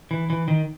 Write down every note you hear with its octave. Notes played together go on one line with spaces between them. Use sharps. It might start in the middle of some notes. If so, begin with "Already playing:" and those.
E3
E3
D#3